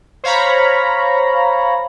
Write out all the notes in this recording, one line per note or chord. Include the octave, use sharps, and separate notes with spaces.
C5 C#5 F5 A#5 B5